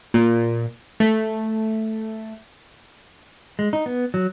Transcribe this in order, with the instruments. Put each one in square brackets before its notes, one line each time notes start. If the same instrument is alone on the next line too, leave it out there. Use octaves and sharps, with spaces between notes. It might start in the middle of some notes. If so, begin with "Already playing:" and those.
[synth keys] A#2
A3
[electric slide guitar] G#3
D#4
B3
F#3